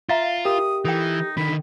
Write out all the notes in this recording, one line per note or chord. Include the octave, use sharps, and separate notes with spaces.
F4 E5 F5 A#5 A6
G4 A#4 D#6
E3 D#4 A4 G5
D3 D#3 B5